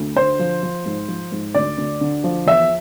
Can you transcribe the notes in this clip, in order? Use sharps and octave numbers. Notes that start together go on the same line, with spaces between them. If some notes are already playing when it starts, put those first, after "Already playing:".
Already playing: D2
D3 C5
F3
F3
G#2
F3
G#2
D2 D5
D2
D3
F3
E2 E5